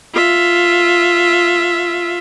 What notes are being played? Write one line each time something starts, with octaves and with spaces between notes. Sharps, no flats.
F4 E5